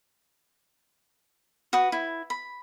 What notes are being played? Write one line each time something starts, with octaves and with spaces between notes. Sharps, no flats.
F#4 B4 D#6
E4
B5